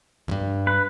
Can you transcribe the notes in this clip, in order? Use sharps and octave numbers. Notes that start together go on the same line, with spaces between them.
E2 G2
B4